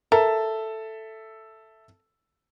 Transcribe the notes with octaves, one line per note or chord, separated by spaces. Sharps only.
A4 A#4 E5